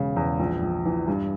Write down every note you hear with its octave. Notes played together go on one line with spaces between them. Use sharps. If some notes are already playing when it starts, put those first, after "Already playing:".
Already playing: E1 C#3
E2
A#1
A#1
E3
G2